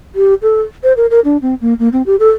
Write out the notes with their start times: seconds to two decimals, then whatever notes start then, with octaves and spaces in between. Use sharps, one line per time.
0.15 G4
0.42 A4
0.83 C5
0.97 A#4
1.10 A#4
1.24 D4
1.42 C4
1.61 A#3
1.79 A#3
1.93 C4
2.06 G4
2.19 A4